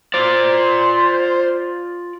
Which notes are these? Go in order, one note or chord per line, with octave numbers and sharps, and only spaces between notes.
F4 C5 D5